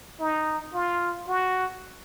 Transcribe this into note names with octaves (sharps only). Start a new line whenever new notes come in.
D#4
F4
F#4